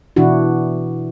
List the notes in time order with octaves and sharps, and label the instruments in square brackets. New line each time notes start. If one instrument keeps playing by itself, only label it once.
[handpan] B2 E3 D4 E4 F#4